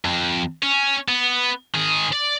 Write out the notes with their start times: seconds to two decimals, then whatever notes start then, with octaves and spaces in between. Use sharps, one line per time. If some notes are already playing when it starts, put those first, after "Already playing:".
0.05 F2
0.63 C#4
1.08 B3
1.75 D#3 G#4
2.13 D5